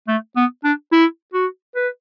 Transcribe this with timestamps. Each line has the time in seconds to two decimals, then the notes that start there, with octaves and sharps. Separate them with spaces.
0.08 A3
0.36 B3
0.64 D4
0.92 E4
1.33 F#4
1.75 B4